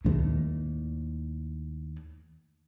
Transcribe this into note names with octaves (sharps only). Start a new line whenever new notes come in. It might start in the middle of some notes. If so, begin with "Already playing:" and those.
D#2 A2